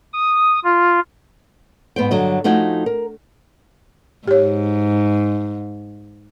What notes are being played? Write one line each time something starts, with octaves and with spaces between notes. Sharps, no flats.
D#6
F4
G#2 B3 C5 G5
G2 D3 F#3 D#5
F3 A3 D#4 F#4 G5 G#5
A#4
G#2 G4 C#5